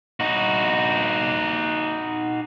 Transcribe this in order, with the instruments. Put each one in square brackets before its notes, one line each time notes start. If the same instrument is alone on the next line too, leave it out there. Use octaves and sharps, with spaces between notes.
[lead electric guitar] D#4 F#4